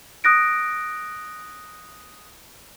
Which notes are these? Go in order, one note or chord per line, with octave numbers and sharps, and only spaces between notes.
D#6 F#6 A#6 D7